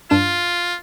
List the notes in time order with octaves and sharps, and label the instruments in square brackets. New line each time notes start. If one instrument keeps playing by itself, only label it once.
[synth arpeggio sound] G2 D4 E7 [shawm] F4